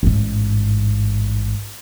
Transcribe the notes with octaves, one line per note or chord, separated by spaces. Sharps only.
A1 G#2